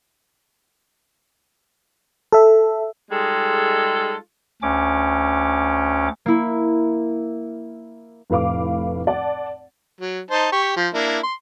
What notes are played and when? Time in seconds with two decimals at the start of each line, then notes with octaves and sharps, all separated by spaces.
2.32 A4 E5
3.11 G3 G#3 D#4 F4 G#4 A4
4.62 D2 C#4 D6
6.26 A#3 E4
8.30 F1 A2 B4 F5 D6
9.07 D5 F#5 A5
10.01 F#3
10.31 D#4 C5 A5
10.52 G4 C#6
10.76 F3
10.94 A#3 D4 E4
11.23 C6